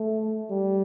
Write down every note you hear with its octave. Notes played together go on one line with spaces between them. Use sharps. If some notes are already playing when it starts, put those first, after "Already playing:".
Already playing: A3
G3